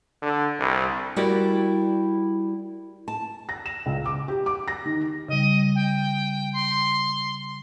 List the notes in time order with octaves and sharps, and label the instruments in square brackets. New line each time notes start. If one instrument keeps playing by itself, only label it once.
[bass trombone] D3
C2
[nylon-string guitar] G3 E4 F#4 G4 A#4 D5
A5
[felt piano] A#6
E7
C#2
D6
G4
D6
A#6
D#3
[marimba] C#3 G3 [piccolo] D#5
[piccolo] G5
C6